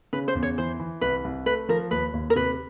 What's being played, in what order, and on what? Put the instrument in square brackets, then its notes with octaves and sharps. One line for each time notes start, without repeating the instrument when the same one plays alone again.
[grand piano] C#3 [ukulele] B4
[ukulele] C5
[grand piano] E2
[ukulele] C#5
[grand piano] E3 [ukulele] C5
[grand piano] E3
[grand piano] C2 [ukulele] B4
[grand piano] C2
[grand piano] A3 [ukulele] B4
[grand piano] F3 [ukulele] A#4
[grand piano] D#2 [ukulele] B4
[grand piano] D#2
[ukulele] A#4
[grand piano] C3 [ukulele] B4